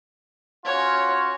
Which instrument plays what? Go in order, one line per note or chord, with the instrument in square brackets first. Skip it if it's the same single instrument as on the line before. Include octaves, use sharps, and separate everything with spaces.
[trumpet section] C#4 F4 F#4 [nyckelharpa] C#5